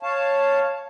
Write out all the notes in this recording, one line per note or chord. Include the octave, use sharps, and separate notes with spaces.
C#5 F5 A5